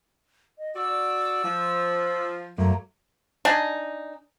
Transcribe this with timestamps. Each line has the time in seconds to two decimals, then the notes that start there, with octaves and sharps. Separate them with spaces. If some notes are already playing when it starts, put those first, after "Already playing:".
0.58 D#5
0.76 F#4 D5 E6
1.44 F3
2.58 F#2 F#3 A3 A#3
3.45 D4 D#4 G#5